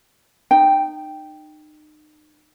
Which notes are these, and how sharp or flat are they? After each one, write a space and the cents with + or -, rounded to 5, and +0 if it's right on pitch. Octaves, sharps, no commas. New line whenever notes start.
D#4 -35 G5 +0